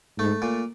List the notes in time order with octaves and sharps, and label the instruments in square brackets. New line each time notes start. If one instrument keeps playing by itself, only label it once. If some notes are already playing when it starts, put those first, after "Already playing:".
[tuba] G#2 [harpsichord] A3
[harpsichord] A#2